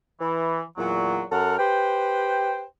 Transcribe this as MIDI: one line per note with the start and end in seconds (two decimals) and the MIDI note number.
0.20 0.62 52
0.77 1.24 40
0.77 1.24 46
0.77 1.24 54
1.31 1.58 42
1.31 1.58 69
1.31 1.58 70
1.31 1.58 78
1.31 1.58 89
1.58 2.64 67
1.58 2.64 71
1.58 2.64 72
1.58 2.64 79